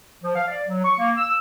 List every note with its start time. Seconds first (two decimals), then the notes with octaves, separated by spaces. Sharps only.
0.23 F3
0.35 F5
0.48 D5
0.68 F#3
0.84 C#6
0.99 A#3
1.17 E6